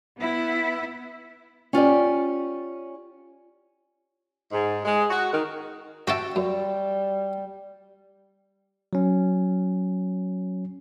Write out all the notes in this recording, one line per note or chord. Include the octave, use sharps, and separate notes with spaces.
B3 E4
C#4 F4 G4 D5
G#2
G#3
F#4
D#3
F#4 G4 E5 G5 A5
F#2 G3
F#3 C#4